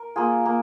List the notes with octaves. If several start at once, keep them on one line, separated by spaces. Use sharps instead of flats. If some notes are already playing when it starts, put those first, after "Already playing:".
Already playing: A#4
A#3 F4 G#4
A#3